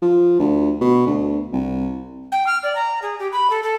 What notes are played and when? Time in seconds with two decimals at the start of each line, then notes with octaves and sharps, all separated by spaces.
0.02 F3
0.40 D2
0.81 B2
1.06 D2
1.52 C2
2.32 G5
2.47 F6
2.63 D5
2.75 A#5
3.02 G#4
3.19 G4
3.32 B5
3.50 A4
3.63 A4